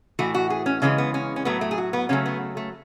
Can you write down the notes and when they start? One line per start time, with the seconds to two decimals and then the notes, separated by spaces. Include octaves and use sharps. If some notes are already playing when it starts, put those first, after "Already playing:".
0.19 A2 E3 A3 F#4
0.35 F#4
0.50 G#4
0.66 C#4
0.82 C#3 E3 G#3 C#4
0.98 B3
1.14 C#4
1.36 C#4
1.45 A2 F#3 A3 B3
1.61 A3
1.71 G#4
1.78 F#4
1.93 B3
2.09 C#3 F#3 A3 C#4
2.26 B3
2.57 A3